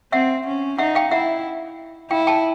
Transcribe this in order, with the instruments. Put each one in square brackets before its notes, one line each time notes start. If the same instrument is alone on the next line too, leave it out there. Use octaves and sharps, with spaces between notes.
[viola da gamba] C4 [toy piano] E5 F#5
[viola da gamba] C#4
[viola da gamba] D#4 [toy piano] E5 F#5
[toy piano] F5 G5
[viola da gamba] E4 [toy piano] E5 F#5
[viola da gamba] E4 [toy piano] F5 G5
[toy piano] G5 A5